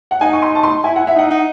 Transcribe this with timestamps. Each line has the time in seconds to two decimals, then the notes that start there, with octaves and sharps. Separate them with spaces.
0.11 F#5
0.21 D#4 G#5
0.33 C#6
0.42 C6
0.55 A5
0.63 C6
0.84 E4 G#5
0.96 E4 F#5
1.07 E5
1.15 D#4 F#5
1.31 D#4